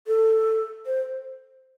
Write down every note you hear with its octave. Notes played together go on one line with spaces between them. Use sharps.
A4
C5